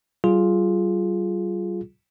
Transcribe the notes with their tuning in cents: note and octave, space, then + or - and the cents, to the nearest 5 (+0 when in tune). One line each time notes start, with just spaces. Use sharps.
G3 -35 F4 +0 G#4 +10